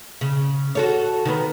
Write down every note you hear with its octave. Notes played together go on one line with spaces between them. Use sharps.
C#3
F#4 A4 C#5
D#3 B3